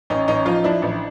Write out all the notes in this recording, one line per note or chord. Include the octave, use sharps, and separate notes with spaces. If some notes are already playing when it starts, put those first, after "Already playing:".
A1 C#4 D#4
A1 C#4 D#4
F3 D#4 F4
F3 D4 E4
A1